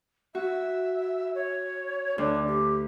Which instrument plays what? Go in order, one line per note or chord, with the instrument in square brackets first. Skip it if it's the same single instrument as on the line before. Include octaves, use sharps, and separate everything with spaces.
[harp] F#4 [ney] E5
[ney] C#5
[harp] D2 [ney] D4
[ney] G4